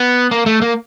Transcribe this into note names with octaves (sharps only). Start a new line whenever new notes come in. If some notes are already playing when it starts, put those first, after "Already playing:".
Already playing: B3
A#3
A3
A#3